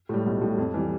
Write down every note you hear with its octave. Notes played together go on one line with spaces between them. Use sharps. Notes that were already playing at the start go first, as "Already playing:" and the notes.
A2 G3
B1
A2 G3
F2
E3 G3